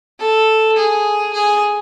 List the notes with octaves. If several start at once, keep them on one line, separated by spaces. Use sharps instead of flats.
A4
G#4
G#4